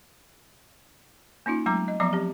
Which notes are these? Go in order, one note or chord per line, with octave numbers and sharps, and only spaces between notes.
A#3 C#4 D#4 F4
F#3 G#3 A3 C4 A#5 D6
D#5
F3 F#3 B3 D5 A#5 D6
C4 G4